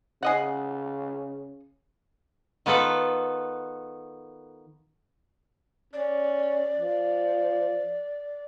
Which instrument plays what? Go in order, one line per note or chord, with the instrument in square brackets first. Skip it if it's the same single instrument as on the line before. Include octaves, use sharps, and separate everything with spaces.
[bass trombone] C#3 [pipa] G#4 D#5 F#5
[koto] D#3 B3 F4 A4 B4
[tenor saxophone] C#4 [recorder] D5
[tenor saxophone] F3